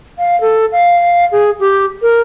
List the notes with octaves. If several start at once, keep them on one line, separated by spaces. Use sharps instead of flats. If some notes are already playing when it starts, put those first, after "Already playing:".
F5
A4
F5
G#4
G4
A#4